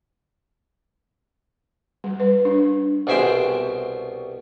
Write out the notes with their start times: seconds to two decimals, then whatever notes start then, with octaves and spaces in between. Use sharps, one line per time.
2.04 G3
2.20 B4
2.45 D4
3.07 C2 B2 G#4 E5 G5 C6